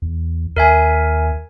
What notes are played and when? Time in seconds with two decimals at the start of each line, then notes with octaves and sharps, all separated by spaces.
0.02 E2
0.56 D#2 A#4 E5 G#5